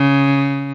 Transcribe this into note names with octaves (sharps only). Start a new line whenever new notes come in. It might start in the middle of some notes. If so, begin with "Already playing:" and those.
Already playing: C#3